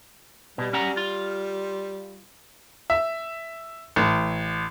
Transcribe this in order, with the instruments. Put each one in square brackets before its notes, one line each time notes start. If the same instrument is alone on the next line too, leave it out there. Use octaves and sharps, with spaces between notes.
[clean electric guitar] B2 [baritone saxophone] G3
[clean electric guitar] C#4 F#5 A#5
F4
[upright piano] E5
A1